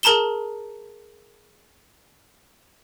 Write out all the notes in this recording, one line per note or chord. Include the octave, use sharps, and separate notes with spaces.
G#4 A#4 A5 A#5 E7 G7